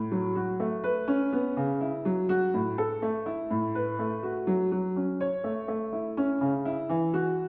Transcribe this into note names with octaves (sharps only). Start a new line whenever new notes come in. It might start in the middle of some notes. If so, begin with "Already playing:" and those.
Already playing: A2
F#3
F#4
A3
B4
C#4
B3
C#3
E4
F#3
F#4
A2
A4
A3
E4
A2
B4
A3
F#4
F#3
F#3
C#4
C#5
A3
A3
E4
C#4
C#3
E4
E3
F#4